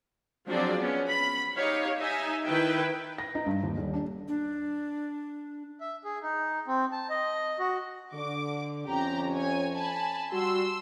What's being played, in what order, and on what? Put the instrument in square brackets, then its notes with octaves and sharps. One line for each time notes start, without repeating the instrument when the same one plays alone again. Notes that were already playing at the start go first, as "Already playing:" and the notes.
[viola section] F3 F#3 C4 D4 G#4 D5
B3 C#4
B5
D#4 G4 C#5 F5
D#4 E5 G#5
D#3 E4 B4 G5
[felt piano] A#6
D#4
G2
D#2
D#1
D4
[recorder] D4
[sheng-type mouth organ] E5
G#4
D#4
C4
A5
D#5
F#4
[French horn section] D3 [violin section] D6
[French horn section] F2 C#4 [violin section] G4 A#5
[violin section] C#5 G#5
G#5 A5 B5
[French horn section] G3 F#4 [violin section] C6 E6